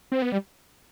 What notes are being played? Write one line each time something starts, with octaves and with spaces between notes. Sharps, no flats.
C4
B3
G3